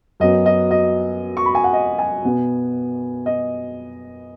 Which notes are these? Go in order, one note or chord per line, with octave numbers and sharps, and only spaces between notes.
F#2 F#3 B3 D#5
D#5
D#5
C#6
B5
G#5
F#5
D#5
G#5
B2 B3
D#5